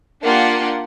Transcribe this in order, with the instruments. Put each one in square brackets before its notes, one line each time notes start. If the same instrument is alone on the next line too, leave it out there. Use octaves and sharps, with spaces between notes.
[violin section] A#3 D4 F4 G4 F#5